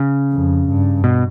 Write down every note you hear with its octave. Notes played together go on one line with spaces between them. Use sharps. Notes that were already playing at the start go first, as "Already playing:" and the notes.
Already playing: C#3
F2
G2
B2